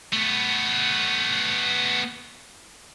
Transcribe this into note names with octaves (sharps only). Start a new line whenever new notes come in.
A3 B3